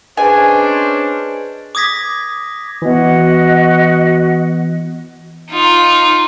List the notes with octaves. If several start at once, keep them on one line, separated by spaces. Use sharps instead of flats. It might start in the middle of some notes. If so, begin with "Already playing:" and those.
C#4 D4 G#4 B4 C5 D#5 G#5
D6 D#6 G#6 A#6 B6
E3 B3 F#4 D#5
D#4 F4